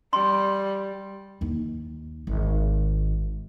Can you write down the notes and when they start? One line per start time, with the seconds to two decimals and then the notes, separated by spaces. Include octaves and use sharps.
0.13 G3 C6
1.41 D#2 D#4
2.27 G#1